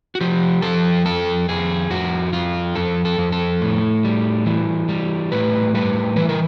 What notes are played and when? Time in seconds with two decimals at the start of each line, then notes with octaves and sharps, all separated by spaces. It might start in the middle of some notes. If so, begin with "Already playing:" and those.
0.15 F#4
0.21 F3 G4
0.62 F3 A4
1.05 F2 A4
1.49 F2 G#4
1.90 F2 F#4
2.33 F2 F4
2.75 F2 A4
3.05 A4
3.18 F2
3.32 A4
3.61 A2
4.05 G3
4.46 E3
4.89 G3
5.32 A2 B4
5.74 G3 B4
6.17 E3 B4
6.29 A#4